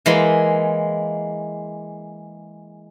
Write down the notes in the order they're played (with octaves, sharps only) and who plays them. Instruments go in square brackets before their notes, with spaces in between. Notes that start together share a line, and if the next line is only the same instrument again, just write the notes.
[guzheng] E3 G#3 A#3 C6